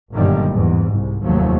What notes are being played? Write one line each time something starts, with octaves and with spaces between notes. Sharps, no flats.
G1 F#2 A#2 D3 D#3 G3
E2 G#2
C2
F1 D#2 F3 F#3 A3